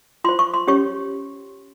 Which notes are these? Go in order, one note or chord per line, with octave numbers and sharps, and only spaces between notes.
F4 C5 C6
C#6
C6
C#4 G4 C#5 C#6